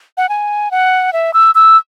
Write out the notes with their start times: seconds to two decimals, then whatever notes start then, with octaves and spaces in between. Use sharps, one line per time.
0.17 F#5
0.29 G#5
0.71 F#5
1.13 E5
1.34 E6
1.55 E6